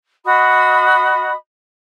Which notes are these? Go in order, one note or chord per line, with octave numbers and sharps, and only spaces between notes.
F#4 D#5 B5 D#6